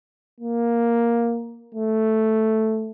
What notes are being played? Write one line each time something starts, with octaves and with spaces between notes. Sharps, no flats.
A#3
A3